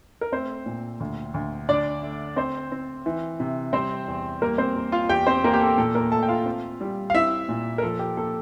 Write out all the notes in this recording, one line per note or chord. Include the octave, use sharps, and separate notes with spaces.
A#4
A3 C4 C5
A#2
D2
D2
D3 D4 D5
A3
C4 C5
C4
E3
C3
G3 C4 C5
E2
G3 A#3 A#4
C4 C5
A#3
F4 F5
E2 G4 G5
C4 C5
E2 A#3 A#4
G4
A4
A#2 A4
A#3 A#4
A3 A4 A5
G5
F4 F5
C4
G3
F5
C4 E4 E5
A#2
A#4
F3 A4
G4
A#3 A4